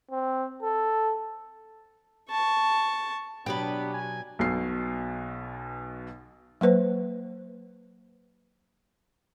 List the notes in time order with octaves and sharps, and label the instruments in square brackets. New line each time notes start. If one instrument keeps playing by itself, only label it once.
[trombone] C4
A4
[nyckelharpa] A5 C#6
[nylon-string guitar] B2 F#3 [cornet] B3 [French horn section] D4 [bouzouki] G4 B4
[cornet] G#5
[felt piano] B1 B2 C7
[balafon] F#3 A#3 B4 C5